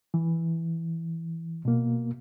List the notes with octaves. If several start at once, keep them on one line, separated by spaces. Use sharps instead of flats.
E3
B2 A#3